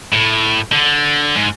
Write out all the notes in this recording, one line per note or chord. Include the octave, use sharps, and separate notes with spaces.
A2
D3
G#2